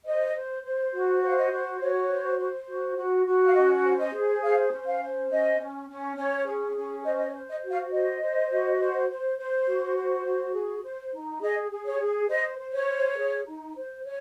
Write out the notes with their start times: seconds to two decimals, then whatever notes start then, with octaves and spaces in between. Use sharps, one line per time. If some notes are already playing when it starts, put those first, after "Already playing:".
0.05 C5 D#5
0.34 C5
0.63 C5
0.93 F#4
1.22 C5 F5
1.36 D#5
1.51 F#4
1.80 F#4 C#5
2.09 C5
2.38 C5
2.67 F#4
2.96 F#4
3.26 F#4
3.46 F5
3.54 C#4 D#5
3.84 C5
3.98 D#5
4.12 G#4
4.42 C5 F5
4.71 C#4
4.86 F5
5.00 C5
5.30 C#4 D#5
5.58 C#4
5.88 C#4
6.16 C#4 C#5
6.46 G#4
6.75 C#4
7.04 C5 D#5
7.16 D#5
7.26 C#5
7.34 C5
7.48 D#5
7.63 F#4
7.70 F5
7.92 C5 D#5
8.20 C5
8.51 F#4
8.79 C5
9.09 C5
9.38 C5
9.66 F#4
9.96 C5
10.25 F#4
10.53 G#4
10.83 C5
11.12 D#4
11.41 G#4 D#5
11.70 G#4
11.85 C#5
11.99 G#4
12.29 C5 D#5
12.58 C5
12.73 C#5
12.87 C5
13.16 G#4
13.45 D#4
13.75 C5
14.04 C#5